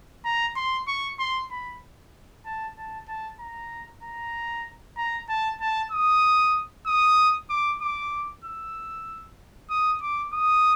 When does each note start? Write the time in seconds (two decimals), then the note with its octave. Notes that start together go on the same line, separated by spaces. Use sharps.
0.25 A#5
0.56 C6
0.88 C#6
1.19 C6
1.51 B5
2.45 A5
2.77 A5
3.08 A5
3.40 A#5
4.03 A#5
4.97 A#5
5.29 A5
5.61 A5
5.92 D#6
6.86 D#6
7.50 D6
7.81 D6
8.44 E6
9.70 D#6
10.01 D6
10.33 D#6